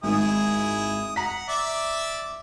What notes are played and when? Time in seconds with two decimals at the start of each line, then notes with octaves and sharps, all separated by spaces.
0.03 G#1 G#2 E4 G#4 D#6
1.16 F#5 A#5 B6
1.49 D5 E5 D6